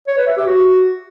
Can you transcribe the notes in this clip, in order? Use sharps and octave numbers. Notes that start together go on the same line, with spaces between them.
C#5
B4
E5
G4
F#4